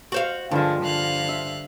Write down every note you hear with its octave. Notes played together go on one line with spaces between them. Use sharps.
F#4 C5 F5
G2 D3 F3 G#3 F4
D3 F5 F#6
E5